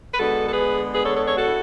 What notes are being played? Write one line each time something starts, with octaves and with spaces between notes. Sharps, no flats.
B4
D3 G#3 B3 D4 F#4 A4
A4
G#4 B4
G#4 B4
A4 C#5
A4 C#5
A4 C#5
F#4 A4
E4